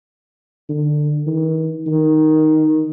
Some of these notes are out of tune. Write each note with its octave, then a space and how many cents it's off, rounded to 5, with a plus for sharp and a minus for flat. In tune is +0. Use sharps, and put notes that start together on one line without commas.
D3 +20
D#3 +45
D#3 +0